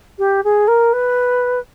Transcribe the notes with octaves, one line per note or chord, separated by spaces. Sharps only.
G4
G#4
A#4
B4